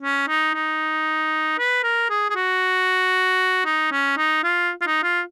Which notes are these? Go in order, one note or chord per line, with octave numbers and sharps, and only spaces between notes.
C#4
D#4
D#4
B4
A#4
G#4
G#4
F#4
D#4
C#4
D#4
F4
F4
D#4
F4